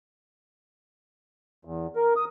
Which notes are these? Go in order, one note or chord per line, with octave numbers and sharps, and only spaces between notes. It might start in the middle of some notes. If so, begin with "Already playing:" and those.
E2
A#4
D#6